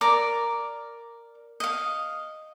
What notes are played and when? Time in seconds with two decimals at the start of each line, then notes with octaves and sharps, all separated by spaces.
0.01 A#4 D5 A#5 D6
1.60 D#5 F5